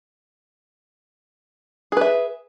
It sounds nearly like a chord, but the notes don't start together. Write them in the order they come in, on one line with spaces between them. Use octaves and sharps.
G#4 B4 E5